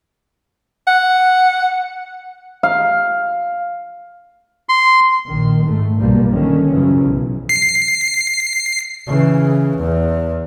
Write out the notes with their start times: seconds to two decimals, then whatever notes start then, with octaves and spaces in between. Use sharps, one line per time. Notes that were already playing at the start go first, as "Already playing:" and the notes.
0.87 F#5
2.63 F5
4.69 C6
5.27 A#1 D#3
5.63 G#2 A3
5.98 B1 G2 B2 F3 G3 A#3
6.29 D3 D#3 C#4
6.71 F#2 C#3 E3 F3
7.03 B1
7.49 C7
9.07 C#3 E3
9.77 E2